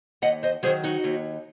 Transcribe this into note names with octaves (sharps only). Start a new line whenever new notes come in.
D#2 D#5 F#5
C5 D#5
D#3 F#3 G#4 C5
D#4 F#4
D#2